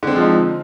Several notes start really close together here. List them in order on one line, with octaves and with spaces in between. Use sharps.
D3 C4 G#3 F3 D#4